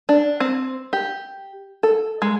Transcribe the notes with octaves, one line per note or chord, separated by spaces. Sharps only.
D4
C4
G4
A4
G#3